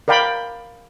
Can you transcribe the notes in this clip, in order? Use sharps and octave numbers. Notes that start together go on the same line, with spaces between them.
A#4 D5 F5 G5 B5